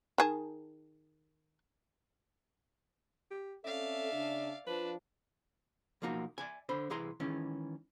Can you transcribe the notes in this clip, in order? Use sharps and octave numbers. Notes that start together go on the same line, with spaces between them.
D#3 G#4 A5
G4
C4 C#4 A4 D5 E5 F5
C#3 D4
F3 D4 B4
B1 F3 A#3 D#4 F#4
D5 E5 G#5
D3 C5 B5
C2 E3 G#4 A#5 C6
D#3 E3 G#3 C#4